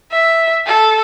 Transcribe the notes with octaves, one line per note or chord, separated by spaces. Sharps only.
E5
A4